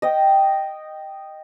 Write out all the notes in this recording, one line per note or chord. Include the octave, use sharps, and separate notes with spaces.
D#5 G5